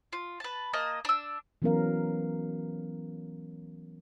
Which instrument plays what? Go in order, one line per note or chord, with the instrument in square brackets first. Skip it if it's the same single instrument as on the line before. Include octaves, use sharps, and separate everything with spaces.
[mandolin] F4
B4 A5
A#3 D#5 A5
D4 E6
[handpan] E3 F#3 B3 C#4 A#4 F5